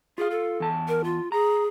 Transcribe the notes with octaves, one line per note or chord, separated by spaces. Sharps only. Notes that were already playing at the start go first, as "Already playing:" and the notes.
F4 G#4 F5
A4
E2 A5
A#4
F4
G#4 A#5